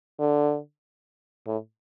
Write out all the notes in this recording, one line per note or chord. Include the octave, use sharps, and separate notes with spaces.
D3
A2